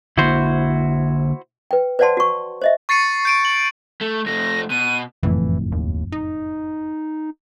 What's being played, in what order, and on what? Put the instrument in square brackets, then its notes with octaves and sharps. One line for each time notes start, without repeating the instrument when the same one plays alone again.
[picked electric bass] D3 A#3 [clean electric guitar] E4 F#4 C5
[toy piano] B4 G5
B4 C5 D5 F#5 A5 C6
F#4 C#6
C5 D#5 E5
[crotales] C#6 A6 C7 C#7 D#7
G6 D7 D#7
F#7
[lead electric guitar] A3
[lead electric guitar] F2 A3 [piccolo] A#6
[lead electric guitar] B2 [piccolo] D#7
[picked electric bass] F#1 F2 A2 [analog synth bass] E3
[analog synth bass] D#2
D#4